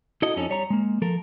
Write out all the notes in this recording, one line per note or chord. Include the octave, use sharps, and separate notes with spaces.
E4 F#4 A4 D#5
F2 F3 C#4 D#4 A4
G3 C#5 A#5
G#3 A#3
F3 A4 A#4